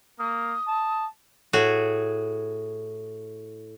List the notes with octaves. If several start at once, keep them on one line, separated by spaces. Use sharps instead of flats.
A#3 D#6
A5
A2 F#4 G#4